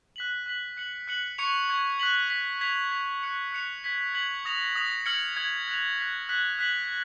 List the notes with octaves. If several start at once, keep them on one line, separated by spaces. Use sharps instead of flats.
F#6 B6 F#7
F#6 B6 F#7
F#6 C#7 F#7
F#6 C#7 F#7
C#6 G#6 C#7 F7
C#6 G#6 C#7 F7
F#6 B6 F#7
F#6 B6 F#7
G#6 B6 F7
G#6 B6 F7
F#6 C#7 F7
F#6 C#7 F7
G#6 B6 F#7
G#6 B6 F#7
D#6 A#6 F7
D#6 A#6 F7
F6 G#6 C#7 F#7
F6 G#6 C#7 F#7
F#6 B6 F7
F#6 B6 F7
F#6 B6 F#7
F#6 B6 F#7